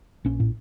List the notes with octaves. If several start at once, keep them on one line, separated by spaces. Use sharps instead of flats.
A#1 C#4
A2